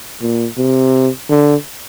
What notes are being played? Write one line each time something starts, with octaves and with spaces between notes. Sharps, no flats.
A#2
C3
D3